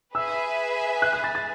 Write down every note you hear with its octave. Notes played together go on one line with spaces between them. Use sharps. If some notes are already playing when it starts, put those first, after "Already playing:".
G#4 B4 E5 G#5 E6
F#6
F#6
A6
A6